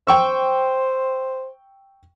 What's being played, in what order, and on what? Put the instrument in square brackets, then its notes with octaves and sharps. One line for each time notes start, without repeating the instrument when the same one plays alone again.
[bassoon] C5 [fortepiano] G5 C#6 E6